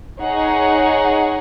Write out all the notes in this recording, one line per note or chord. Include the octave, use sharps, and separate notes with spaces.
D#4 G#4 C#5 F#5